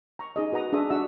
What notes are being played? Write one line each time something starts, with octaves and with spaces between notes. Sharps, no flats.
A#5 C#6
D#4 G#4 D#5
F#4 B4 F#5 A#5 D#6
D4 G#4 A4 E5 D#6
D4 F#4 E5 F#5 E6